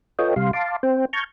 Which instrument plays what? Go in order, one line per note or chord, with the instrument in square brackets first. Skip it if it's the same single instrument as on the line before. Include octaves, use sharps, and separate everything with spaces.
[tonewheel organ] F4 A4 B4 C#5 D#5 G5
C3 G3 F5 C6
F5 A5 C6 D6
C4 C5 G5
A5 A#5 C#6 F6 G6 G#6